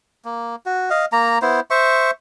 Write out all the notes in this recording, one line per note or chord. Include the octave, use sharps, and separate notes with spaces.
A#3
F#4
D#5 F5
A#3 A#5
B3 E4 C5
C5 E5 C#6